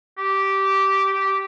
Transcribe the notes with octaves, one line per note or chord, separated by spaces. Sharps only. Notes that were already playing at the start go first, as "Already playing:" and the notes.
G4
G4